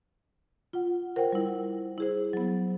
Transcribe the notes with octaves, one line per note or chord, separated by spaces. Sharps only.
F4 F#5
A#4 C5 F#5 G5
G3 E4
E4 G#4 C5
F#3 B3